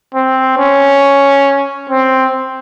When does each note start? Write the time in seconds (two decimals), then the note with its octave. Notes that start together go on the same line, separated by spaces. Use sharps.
0.14 C4
0.58 C#4
1.90 C4